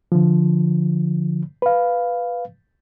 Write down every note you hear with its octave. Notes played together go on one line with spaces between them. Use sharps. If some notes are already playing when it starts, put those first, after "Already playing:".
D3 F3
B4 F5